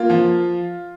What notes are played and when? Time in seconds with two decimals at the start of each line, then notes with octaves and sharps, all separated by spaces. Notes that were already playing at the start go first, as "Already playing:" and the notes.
Already playing: A#3 F4 F5
0.10 F3